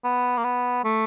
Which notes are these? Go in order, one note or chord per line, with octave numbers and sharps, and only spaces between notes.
B3
A#3
B3
A3